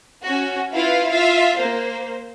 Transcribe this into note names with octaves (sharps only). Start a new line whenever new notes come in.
C#4 F#4
E4 F4 B4 F5
F4 E5 F5
A#3 C5